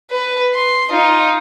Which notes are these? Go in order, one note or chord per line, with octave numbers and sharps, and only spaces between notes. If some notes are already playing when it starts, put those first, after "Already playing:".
B4
C6
D#4 F4